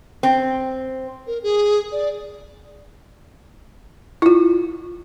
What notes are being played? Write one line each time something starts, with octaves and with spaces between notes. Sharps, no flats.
C4
A#4
G#4
D5
E4 F4